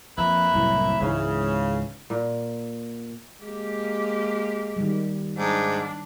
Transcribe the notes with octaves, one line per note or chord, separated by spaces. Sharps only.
F2 A#3 B4 E5
C2 F#2 A2
C#2 G#2 C#3 E3
A#2
G#3 A#3 G4
D#3 G3
G#2 D4